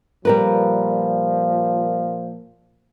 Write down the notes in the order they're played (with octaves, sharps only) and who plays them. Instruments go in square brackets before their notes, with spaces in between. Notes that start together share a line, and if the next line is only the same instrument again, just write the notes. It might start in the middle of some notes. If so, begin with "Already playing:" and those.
[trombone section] A#2 F3 [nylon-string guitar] G3 A#4 B4